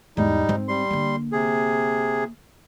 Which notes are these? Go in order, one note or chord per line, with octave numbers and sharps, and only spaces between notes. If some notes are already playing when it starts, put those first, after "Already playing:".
E2 G#2 G3 D#4
G#2 C4
G3 C6
D3 A#3
C3 G#4